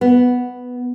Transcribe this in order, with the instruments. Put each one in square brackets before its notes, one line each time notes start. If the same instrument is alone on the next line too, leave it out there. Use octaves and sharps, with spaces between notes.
[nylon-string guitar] B3